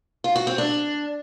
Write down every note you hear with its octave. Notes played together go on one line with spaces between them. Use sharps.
F4
F#4
C4
D4